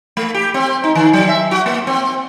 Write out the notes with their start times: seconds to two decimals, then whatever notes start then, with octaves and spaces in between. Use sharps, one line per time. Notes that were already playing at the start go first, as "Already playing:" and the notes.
0.17 A3
0.34 G4
0.54 C4
0.84 D#4
0.95 D#3
1.13 F#3
1.29 E5
1.51 F#4
1.66 A#3
1.87 C4